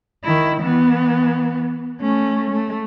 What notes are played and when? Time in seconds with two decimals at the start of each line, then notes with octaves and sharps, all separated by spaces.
0.25 D#3 E4
0.61 E3 B3
2.00 A3 C#4
2.50 A3